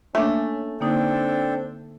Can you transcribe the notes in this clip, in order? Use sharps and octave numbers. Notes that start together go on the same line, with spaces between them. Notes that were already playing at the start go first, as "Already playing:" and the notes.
A3 A#3 C#4 D4
D3 A#3 C4 D4 D#4 A4 G5